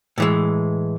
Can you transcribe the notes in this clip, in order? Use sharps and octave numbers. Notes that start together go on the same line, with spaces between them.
A2 E3 G#3